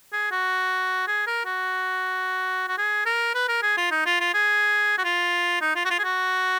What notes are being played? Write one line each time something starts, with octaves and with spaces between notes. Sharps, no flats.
G#4
F#4
G#4
A#4
F#4
F#4
G#4
A#4
B4
A#4
G#4
F4
D#4
F4
F4
G#4
F#4
F4
D#4
F4
F#4
F4
G#4
F#4